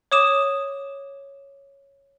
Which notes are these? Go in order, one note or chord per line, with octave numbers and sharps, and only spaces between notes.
C#5 D6 D#6 E7